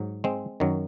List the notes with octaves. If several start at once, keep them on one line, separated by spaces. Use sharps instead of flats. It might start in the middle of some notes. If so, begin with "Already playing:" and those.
Already playing: G#2 F#3
G#3 C4
F#2 D#3 F#3